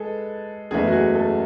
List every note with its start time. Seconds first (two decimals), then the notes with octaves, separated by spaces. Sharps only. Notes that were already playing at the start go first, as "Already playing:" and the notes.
Already playing: G#3 G#4 A4 B4
0.71 F#1 E2 C#3 E3 A3 G#4
0.87 F#4
0.93 G#4
1.15 A4